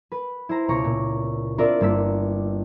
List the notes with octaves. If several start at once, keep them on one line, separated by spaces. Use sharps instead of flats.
B4
E4 C5 A#5
C#2 B2 C#5 A#5 C#6 D6
A#2
C4 D4 F4 A#4 D5 E5
G1 A#3 E6 B6